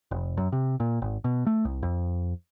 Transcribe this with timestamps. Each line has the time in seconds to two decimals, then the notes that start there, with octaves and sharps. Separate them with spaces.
0.11 F1
0.37 F#2
0.52 C3
0.80 A#2
1.02 G#1
1.24 B2
1.47 A3
1.65 C2
1.83 F2